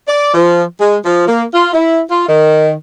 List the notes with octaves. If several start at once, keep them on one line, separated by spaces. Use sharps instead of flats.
D5
F3
G#3
F3
A#3
F4
E4
F4
D#3